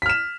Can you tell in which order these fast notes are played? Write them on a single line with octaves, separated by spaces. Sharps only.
B6 F6 E7